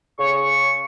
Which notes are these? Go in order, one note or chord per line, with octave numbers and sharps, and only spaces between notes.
C#3 C#6